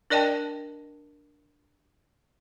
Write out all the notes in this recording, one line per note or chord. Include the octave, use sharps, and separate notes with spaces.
D4 A#4 D5 D#5 G5 A5